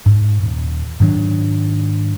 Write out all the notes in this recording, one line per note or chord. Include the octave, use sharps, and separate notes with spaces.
G#2
D#1
G#2 D#3 F#3 D4